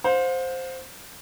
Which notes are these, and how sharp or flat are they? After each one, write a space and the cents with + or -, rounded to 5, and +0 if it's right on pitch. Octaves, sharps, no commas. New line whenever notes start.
C5 +0 F5 +40